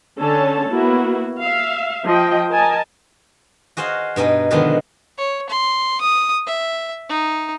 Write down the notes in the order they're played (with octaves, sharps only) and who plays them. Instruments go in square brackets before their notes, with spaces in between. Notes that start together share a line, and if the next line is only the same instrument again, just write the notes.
[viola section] D3 C#4 A4 C#5 A5
A#3 B3 E4 F#4
E5 F5
F3 D#5 G5
A#4 D#5 G#5 A5
[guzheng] F#4 G#4 C5 D#5 F5
G2 B2 D#4 G#4
B2 D3 D#3 F3 G#3 B3
[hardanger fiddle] C#5
C6
D#6
E5
D#4